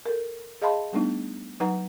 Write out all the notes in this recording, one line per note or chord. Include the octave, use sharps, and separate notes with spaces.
A4 A#4
G#4 D#5 F5 A5 B5 C6
G3 A3 B3 D4 D#4
F#3 D#4 B4 F#5 A#5